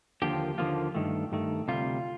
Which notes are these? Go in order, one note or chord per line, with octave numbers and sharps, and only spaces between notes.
D#2 D3 F3 A#3 F4 G4
D#2 D3 F3 A#3 F4
G2 D#3 A3
G2 D#3 A3
D2 C3 G3 F4